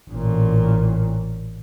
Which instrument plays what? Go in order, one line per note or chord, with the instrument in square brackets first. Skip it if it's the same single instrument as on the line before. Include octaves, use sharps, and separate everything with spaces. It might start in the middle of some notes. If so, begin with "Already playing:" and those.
[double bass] A1 A#2